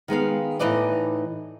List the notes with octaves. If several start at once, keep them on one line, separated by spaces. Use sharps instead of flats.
D#3 G#3 B3 F5
A2 E3 D#4 B4 D5 D#5